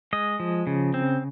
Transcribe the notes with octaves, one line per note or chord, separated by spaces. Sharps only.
G#3 D#5
F3
C#3
C4